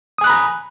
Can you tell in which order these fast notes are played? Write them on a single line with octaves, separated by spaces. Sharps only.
D#6 G#5 F#6 B5 A#5